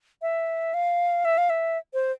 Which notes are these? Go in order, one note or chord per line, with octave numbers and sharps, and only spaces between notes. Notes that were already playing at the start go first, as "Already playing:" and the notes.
E5
F5
E5
F5
E5
C5